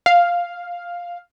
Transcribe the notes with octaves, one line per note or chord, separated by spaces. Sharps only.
F5